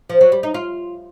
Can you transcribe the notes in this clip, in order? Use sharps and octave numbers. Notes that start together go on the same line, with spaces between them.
F3
F#3
G3
D#4
F4